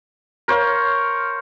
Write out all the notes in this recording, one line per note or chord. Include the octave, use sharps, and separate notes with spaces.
A#4 C5 C#5 F5